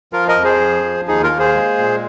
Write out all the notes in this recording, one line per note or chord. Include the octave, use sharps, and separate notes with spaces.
F3 F4 A#4
A#4 D#5
F2
G#4 C5
F3
F3
D#2 D#4 G#4
F4 A#4
A#3
G#4 C5
G#3
A#2